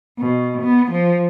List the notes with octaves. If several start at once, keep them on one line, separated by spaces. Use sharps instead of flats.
B2
B3
F3